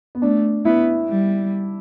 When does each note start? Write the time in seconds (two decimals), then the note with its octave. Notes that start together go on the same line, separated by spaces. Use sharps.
0.15 B3
0.22 A3 D4
0.65 B3 E4
1.09 G3